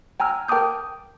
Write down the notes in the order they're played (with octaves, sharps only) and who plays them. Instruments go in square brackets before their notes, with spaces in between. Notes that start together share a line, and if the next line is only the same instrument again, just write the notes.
[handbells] G5 G#5 A#5 E6 F6
A#4 G5 A5 D6 D#6 G6